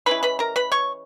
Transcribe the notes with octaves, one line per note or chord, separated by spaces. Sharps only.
E3 G#3 C#4 E4 B4 B5
B4 B5
A#4 A#5
B4 B5
C#5 C#6